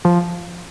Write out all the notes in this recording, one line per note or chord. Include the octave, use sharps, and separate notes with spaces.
F3